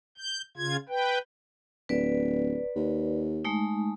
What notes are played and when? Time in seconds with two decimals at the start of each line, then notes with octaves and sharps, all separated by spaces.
0.18 G6
0.57 C#3 F4 G#6
0.89 B4 G5
1.89 D1 B4 D5
2.76 D#2
3.45 G#3 A3 D#4